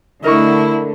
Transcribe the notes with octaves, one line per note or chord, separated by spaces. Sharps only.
D3 A3 E4 A#4 D#5 C#6